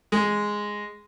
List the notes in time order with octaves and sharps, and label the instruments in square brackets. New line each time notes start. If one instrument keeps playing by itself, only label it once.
[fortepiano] G#3